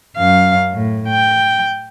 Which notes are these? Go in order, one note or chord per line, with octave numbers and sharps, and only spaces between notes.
F#2 F5
A2
G5